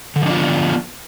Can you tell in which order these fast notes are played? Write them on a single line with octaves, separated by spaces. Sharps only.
D3 F3 D4 F4 B3